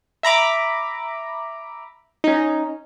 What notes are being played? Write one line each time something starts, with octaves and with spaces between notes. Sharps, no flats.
E5 A#5 B5 D6
C#4 D#4